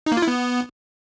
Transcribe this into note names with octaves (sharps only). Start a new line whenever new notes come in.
D#4
A#3
F4
E4
B3